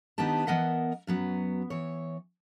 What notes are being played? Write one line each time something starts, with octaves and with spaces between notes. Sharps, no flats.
D#3 B3 D4 D#4 G4 A5
E3 B3 A#4 D#5 F#5 A5
F#2 F#3 B3
E3 C#5